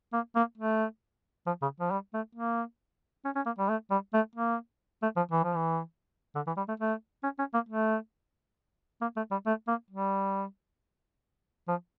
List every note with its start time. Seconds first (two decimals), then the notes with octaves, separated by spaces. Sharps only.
0.13 A#3
0.36 A#3
0.58 A3
1.47 F3
1.62 C#3
1.80 F3
1.91 G3
2.14 A3
2.35 A#3
3.25 C#4
3.36 C#4
3.46 A#3
3.58 G3
3.69 A3
3.90 G3
4.14 A3
4.35 A#3
5.02 A3
5.17 F3
5.31 E3
5.44 F3
5.55 E3
6.35 D3
6.47 E3
6.57 G3
6.68 A3
6.80 A3
7.23 C#4
7.39 C#4
7.54 A#3
7.69 A3
9.01 A#3
9.17 A3
9.31 G3
9.46 A3
9.67 A#3
9.90 G3
11.68 F3